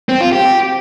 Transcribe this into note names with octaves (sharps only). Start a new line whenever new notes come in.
C4
F4
G4